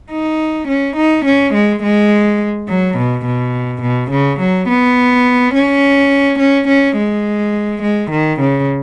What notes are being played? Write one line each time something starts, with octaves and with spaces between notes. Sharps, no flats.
D#4
C#4
D#4
C#4
G#3
G#3
F#3
B2
B2
B2
C#3
F#3
B3
C#4
C#4
C#4
G#3
G#3
D#3
C#3